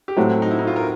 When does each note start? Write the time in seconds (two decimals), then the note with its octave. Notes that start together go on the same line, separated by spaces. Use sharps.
0.08 G4
0.17 A2 F#3 A3 C4 F#4
0.42 D#4
0.51 E4
0.59 D#4
0.67 F4
0.76 A#4